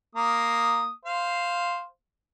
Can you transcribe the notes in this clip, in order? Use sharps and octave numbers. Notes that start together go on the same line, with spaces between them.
A#3 D#6
C5 F5